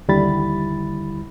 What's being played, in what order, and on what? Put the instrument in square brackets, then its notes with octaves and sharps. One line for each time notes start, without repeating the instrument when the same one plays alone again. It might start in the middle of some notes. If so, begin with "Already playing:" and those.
[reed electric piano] D#2 D3 G3 E4 B5 A6